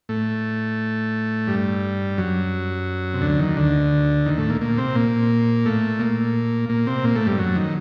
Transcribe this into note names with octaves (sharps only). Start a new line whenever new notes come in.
A2 A3
G2 G3
F#2 F#3
C3
D2 D3
D#2 D#3
D2 D3
D#2 D#3
A2 A3
A#2 A#3
A#2 A#3
C3 C4
A#2 A#3
A2 A3
A#2 A#3
A#2 A#3
C3 C4
A#2 A#3
A2 A3
G2 G3
F#2 F#3
D#3